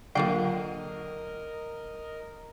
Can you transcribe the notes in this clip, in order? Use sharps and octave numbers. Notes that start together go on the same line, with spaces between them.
D3 F#3 A#3 D4 F4 A#4 D#5 G5